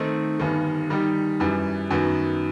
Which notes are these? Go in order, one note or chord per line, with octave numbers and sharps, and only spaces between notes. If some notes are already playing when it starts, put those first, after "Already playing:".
Already playing: D#3 A3 C4 D#4
G1 G2 D#3
D#3 G3 D#4 G4
F#2 E3 G3
F#2 D#3 F#3 B3